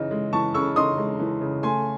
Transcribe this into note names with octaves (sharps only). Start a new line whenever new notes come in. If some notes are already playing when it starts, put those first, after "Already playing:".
Already playing: C#3 E3 D#4
G#3
E3 A5 C#6
C#3 C#6 E6
D#4 C6 D#6
G#3
E3
C#3
A3 G#5 C6